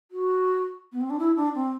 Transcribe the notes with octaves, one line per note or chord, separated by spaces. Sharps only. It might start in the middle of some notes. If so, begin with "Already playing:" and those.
F#4
B3
C4
D4
E4
D4
C4